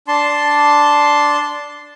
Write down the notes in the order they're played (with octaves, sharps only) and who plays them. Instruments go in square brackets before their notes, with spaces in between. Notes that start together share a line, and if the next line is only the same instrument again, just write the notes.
[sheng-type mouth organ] D4 A5 C6